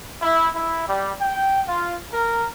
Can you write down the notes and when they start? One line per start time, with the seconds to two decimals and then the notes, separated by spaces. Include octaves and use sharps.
0.21 E4
0.54 E4
0.87 G3
1.21 G5
1.67 F4
2.11 A#4